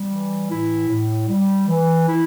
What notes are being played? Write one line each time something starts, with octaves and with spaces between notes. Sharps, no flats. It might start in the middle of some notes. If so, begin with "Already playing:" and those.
Already playing: G3
E3
A2 E4
A2
G3
E3
E4